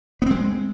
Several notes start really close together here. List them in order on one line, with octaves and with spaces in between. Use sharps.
B3 C4 G#3